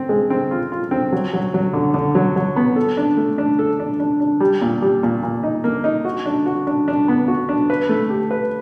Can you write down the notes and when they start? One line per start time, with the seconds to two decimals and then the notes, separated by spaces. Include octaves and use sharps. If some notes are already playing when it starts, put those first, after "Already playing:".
Already playing: C4
0.09 G#3
0.30 C4
0.51 F4
0.72 F4
0.91 C4
1.13 F#3
1.34 F#3
1.54 F#3
1.73 D3
1.94 D3
2.15 F#3
2.36 F#3
2.56 B3
2.76 A4
2.97 D4
3.17 A3
3.38 D4
3.59 A4
3.80 D4
4.00 D4
4.20 D4
4.40 G3
4.61 A#2
4.82 G3
5.03 A#2
5.23 A#2
5.43 D#4
5.64 A#3
5.84 D#4
6.05 F#4
6.26 D4
6.46 F#4
6.67 D4
6.88 D4
7.08 B3
7.28 F#4
7.49 D4
7.70 B4
7.89 A3
8.10 G4
8.31 B4